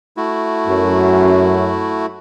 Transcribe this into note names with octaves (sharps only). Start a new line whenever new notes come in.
A3 E4 F#4
F#2